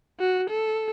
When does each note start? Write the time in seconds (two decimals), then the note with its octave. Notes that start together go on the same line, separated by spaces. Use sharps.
0.20 F#4
0.50 A4